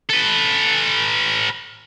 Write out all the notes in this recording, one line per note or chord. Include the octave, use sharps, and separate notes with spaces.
A4 B4